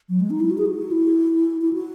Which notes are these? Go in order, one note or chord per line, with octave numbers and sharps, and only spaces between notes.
F#3
G#3
D#4
E4
F#4
G#4
F#4
E4
E4
F#4